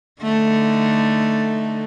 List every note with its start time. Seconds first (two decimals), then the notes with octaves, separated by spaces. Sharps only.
0.22 D3 A3 D#4